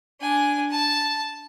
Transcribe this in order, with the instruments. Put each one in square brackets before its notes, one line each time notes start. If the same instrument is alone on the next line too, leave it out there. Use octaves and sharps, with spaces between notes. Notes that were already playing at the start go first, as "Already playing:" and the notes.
[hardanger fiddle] D4 G#5
A5